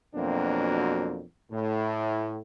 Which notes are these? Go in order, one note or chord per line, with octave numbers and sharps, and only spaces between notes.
F2 B2 F#3 A#3 C4 D4
A2